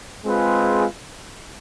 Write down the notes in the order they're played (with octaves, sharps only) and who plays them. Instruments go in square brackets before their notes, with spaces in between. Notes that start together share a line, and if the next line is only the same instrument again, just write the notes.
[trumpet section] G#3 C4 F4 G#4 B4